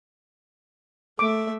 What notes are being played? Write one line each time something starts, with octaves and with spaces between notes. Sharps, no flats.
A3 E5 D6